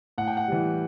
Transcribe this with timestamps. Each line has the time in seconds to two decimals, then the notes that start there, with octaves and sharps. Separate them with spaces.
0.18 A2 F#5
0.28 G5
0.37 F#5
0.48 E3 G3